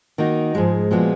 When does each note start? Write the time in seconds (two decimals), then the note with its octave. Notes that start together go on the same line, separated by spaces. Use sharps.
0.18 D#3 A#3 D#4 F#4
0.55 G#2 F3 G#3
0.91 A#2 F3 G#3 B3 F#4